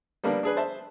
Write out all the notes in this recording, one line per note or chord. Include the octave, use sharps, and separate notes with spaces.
G3 A#3 B3 D4
D4 G#4 B4
C5 E5 A5